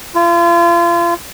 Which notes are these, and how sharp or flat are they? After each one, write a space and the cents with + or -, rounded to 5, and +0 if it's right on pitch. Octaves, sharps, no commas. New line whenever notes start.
F4 -35